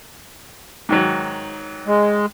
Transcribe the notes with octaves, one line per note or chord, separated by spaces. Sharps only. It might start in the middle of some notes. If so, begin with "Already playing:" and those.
G#2 D#3 F#3
G#3